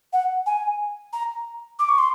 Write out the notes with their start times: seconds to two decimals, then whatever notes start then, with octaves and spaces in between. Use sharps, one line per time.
0.13 F#5
0.46 G#5
1.13 A#5
1.79 D6
1.89 C#6
1.98 C6